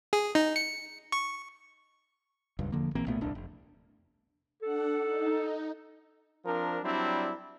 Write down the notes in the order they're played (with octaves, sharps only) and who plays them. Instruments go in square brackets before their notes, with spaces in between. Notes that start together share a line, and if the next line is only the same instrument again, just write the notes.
[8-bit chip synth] G#4
D#4
C#7
C#6
[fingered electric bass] D#1 C#2 G2
E1 D3 F3 A#3
A#1 E3 A#3 C4
B1 A#2 A3 B3
D#1 C2 D4
F1
[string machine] D4 F#5 [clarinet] A4
[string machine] D#4
[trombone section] F3 C4 D4 A#4
F#3 G3 C4 D4 E4